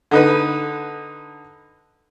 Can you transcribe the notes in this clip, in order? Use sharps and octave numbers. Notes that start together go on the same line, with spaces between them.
D3 D#4 B4